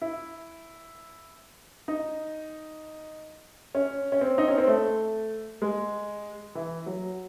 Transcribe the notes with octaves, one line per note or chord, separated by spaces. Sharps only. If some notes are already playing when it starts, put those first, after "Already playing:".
E4
D#4
C#4
C#4
C4
D#4
C#4
C4
A3
G#3
E3
F#3